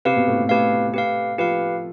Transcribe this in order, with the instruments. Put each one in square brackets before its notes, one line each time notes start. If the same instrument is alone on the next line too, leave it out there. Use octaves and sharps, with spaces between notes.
[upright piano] C3 C4 [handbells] G4 B4 F5
[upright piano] B2 B3
A2 A3
B2 B3
[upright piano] A3 A4 [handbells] G4 B4 F5
[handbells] G4 B4 F5
[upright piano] F3 F4 [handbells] G4 B4 F5